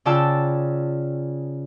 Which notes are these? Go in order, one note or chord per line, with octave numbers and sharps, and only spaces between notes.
C#3 F4 D5 G5 A5 E6